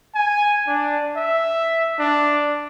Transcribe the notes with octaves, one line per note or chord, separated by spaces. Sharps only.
G#5
D4
E5
D4